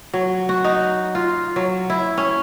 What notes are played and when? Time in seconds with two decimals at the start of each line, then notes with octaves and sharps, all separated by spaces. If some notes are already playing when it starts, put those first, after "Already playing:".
0.14 F#3
0.49 F#4
0.64 D#4
1.15 F4
1.56 F#3
1.90 E4
2.18 C#4